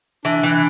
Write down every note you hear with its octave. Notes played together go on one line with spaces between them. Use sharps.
E3 D4
E3